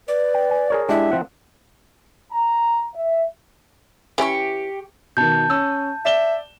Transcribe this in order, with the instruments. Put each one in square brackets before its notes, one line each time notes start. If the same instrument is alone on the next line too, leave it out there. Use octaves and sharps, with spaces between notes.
[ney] B4 [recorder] D5
[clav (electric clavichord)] G5
G#5
G#4 A#4 C#5
[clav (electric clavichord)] G#3 D4 G4 [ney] E4 [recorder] E5
[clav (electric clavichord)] F3 C4 F#5
[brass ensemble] A#5
E5
[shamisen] E3 C#4 E4 [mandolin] G4 C#6
[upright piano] B2 D#3 [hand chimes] A5 G6
[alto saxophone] C#4 [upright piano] E6
[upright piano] D5 E7 G7 [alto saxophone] E5